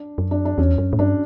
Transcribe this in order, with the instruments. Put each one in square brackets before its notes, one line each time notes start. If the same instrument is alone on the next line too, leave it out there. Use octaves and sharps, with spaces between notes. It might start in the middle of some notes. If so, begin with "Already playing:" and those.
Already playing: [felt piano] D4
[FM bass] F#2
[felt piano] D4
D4
[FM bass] E2 [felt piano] C#4
[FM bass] F#2
A2
[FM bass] G2 [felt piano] D4